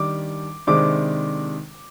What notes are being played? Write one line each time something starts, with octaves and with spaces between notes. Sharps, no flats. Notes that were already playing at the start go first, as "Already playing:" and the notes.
Already playing: D#3 G3 D4 D6
C3 D#3 G#3 D4 D6